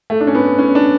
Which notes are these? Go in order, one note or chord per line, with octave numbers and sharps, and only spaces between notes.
A3
D4
C#4
B3
C#4
D4